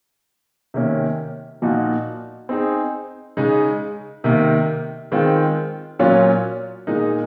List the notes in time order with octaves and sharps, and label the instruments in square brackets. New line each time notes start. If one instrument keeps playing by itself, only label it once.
[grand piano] C3 D#3 A#3 C#4
A#2 F3 A#3 D#4 F#4
C4 D#4 G#4
C#3 G#3 D#4
C3 D#3 A#3
D#3 G#3 C4 F4
A#2 F#3 C#4 F4
A#2 G#3 D#4 A#4